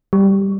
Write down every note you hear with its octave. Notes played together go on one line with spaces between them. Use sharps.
G3